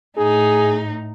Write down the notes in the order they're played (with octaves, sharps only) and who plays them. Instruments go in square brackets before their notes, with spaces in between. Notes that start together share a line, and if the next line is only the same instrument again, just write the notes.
[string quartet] A2 D#4 [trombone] G#4